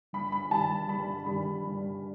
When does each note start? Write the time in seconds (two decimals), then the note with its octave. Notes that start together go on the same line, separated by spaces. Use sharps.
0.13 G1 B5
0.32 B5
0.51 G2 D#3 G3 A5
0.88 G1 B5
1.25 G2 D#3 G3 B5
1.64 G1